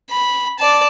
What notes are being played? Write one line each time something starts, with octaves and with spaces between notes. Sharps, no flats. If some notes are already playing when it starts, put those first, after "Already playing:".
B5
D5 A5